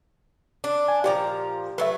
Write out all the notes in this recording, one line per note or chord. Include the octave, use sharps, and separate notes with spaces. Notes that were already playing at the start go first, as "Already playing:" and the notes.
D4
G#5
A#2 F3 G4 D5 A#5
F#3 A3 B4 E5